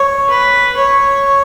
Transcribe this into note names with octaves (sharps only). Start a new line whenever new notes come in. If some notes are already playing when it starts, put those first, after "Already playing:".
Already playing: C#5
B4
C#5